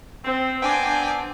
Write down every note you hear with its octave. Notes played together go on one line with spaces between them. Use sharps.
C4
B3 C4 D4 G5 G#5 D6